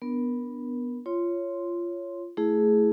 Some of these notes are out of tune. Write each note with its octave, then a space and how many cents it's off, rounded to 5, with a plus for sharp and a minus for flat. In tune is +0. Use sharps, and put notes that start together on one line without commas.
B3 +0 D4 +0 A#4 +20
F4 -15 C#5 +0 C6 +0
A3 +0 E4 +0 G#4 +10